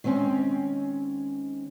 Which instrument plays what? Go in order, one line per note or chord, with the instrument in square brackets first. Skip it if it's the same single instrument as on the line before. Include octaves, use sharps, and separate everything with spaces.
[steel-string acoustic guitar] D#3 G#3 C4 C#4